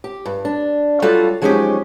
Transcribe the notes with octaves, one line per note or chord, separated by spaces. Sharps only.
G4
G2
D4
F#3 G3 F4 F#4 A4 F5
F3 F#3 G#3 C#4 D#4 G4